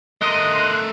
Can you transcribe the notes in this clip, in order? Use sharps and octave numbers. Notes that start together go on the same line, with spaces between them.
A3 A#4 D#5 C6 F#6